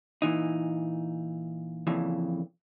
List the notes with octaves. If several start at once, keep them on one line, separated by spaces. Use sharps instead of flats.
A#2 E3 D#4
F2 A#2 C#3 E3